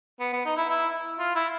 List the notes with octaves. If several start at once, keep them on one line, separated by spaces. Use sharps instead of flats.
B3
B3
D#4
E4
E4
F4
E4